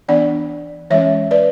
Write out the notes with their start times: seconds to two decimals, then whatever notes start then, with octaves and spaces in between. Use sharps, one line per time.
0.08 E3 B3 D4 D5 F#5
0.90 E3 G#3 C#4 C#5 E5
1.31 B4 D5